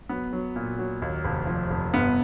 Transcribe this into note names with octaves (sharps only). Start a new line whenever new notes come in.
F#3 B3
F#3
A#2
F#3
D#2
F1
F3
F1
G1 B3